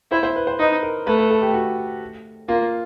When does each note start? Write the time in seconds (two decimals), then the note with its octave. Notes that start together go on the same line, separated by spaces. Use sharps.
0.11 E4 C5
0.23 C5
0.36 B4
0.47 C5
0.59 D#4 B4
0.83 A#4
1.07 A3 B4
1.19 B4
1.30 A4
1.41 G4
1.54 F#4
2.48 A#3 F4